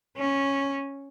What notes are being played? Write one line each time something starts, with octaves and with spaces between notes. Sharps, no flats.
C#4